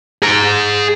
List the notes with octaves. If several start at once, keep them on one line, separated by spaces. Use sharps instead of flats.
G#4 A#5